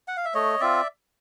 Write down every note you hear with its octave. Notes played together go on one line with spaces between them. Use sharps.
F#5
F5
E5
A3 C#5 D#5
C4 F4 D5 E5